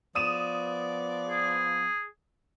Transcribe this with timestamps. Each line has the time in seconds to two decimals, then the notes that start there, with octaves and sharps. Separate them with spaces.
0.15 F3 B3 D5 D#6 D#7 E7
1.28 G#4